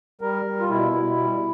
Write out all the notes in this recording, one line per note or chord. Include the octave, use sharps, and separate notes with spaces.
G3 A#4
G3
F4
B2 E4
B2
G3